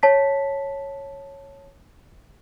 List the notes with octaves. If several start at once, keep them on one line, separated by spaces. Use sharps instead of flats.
C#5 A5 B6